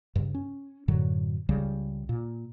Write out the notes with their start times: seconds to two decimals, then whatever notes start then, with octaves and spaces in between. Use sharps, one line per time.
0.15 G2 C#3
0.35 C#4
0.88 F#2 A2 D3 F#3
1.49 C#2 C#3 G3
2.09 A#2